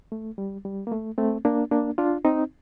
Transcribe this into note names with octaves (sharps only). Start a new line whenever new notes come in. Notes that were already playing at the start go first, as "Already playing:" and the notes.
A3
G3
G3
A#3
A3
A3 C4
A#3 D4
A#3 D4
D4 F4
C4 D#4